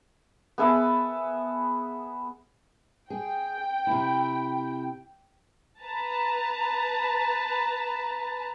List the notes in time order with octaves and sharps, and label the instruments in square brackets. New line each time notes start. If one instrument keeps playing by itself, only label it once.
[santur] B3 G#4 E5 A5
[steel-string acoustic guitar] G#4 [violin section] G5
[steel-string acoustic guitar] C3 E4
[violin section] B4 A5 A#5